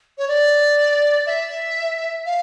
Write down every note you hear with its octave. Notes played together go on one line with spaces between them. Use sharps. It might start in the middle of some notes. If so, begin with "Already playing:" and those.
C#5
D5
E5
F5